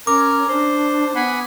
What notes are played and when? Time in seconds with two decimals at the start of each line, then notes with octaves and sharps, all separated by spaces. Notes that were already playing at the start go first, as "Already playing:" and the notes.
0.07 C#4 A#4 D6
0.49 D4 C5
1.16 B3 F#5 G#5 B5